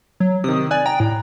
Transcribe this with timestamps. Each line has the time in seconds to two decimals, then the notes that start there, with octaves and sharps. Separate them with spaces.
0.20 F#3
0.44 C3 D#3 D#6
0.71 D5 G#5 F#6
0.86 G5 A#5
1.00 A2